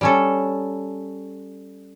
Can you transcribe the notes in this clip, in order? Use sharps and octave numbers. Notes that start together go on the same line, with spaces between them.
G3 C#4 A4